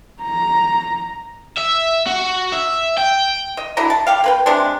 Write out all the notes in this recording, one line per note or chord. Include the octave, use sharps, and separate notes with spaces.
A#5
E5
F#4
E5
G5
D#5
D3 F#3 E4 A#5
A5
G3 G4 F5
A#3 B4 G5
C3 G#3 D4